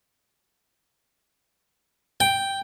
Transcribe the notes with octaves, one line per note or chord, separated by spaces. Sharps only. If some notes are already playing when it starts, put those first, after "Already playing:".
G5